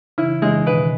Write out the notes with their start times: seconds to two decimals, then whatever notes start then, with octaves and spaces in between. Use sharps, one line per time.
0.18 C#3 E3 E4
0.42 C#3 E3 G#3
0.66 B2 D#3 B4